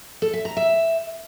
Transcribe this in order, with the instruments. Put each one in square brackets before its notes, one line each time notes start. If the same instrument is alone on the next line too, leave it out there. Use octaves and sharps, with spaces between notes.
[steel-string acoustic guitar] A4
E5
A#5
E5